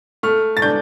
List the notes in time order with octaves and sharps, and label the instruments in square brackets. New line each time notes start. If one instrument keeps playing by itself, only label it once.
[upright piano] A3 F6
A6
D4 G6